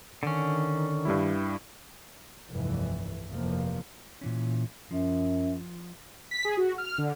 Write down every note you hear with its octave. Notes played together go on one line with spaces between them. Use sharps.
D3 D#3 C#4
G2 G3 E4
F1 C2 G2 E3
F1 G2 C3 E3 F3 A#3
A#2 E3 C#4
F#2 F3
B6
G#4
F#4
F6
D3